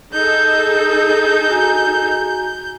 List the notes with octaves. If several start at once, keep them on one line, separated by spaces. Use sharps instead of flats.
D#4 G#4 A4 G6
F#4 G#5 A#5